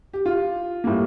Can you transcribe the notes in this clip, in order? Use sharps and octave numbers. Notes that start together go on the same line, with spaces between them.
G4
F4
A2 G3 A#3